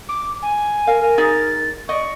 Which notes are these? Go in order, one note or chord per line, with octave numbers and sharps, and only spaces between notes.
D6
G#5
A#4 F5
A#4
D#4 G#4 A6
D5 D#5 C#6